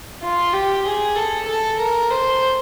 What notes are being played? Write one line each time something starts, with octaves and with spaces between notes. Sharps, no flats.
F4
G4
G#4
A4
A4
A#4
C5